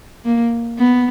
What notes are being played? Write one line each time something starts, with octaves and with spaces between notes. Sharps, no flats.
A#3
B3